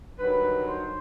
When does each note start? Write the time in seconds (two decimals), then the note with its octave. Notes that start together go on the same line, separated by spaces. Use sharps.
0.18 G2 D#3 F#3 B4
0.68 C5